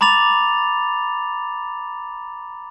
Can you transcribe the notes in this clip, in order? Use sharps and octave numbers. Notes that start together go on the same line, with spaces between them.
A#5 B5 D6 A6 F7